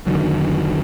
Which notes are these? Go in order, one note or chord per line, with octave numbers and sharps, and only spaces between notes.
F1 D3 D#3 F#3